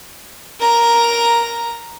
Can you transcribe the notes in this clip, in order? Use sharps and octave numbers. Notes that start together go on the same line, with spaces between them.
A#4 A#5